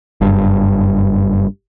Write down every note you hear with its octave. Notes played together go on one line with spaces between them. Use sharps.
F#1 G2